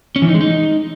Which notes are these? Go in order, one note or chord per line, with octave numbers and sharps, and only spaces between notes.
C#4
E3
D#4
G#3
D#4